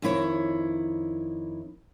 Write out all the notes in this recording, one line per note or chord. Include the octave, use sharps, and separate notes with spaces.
F2 D#3 E4 C#5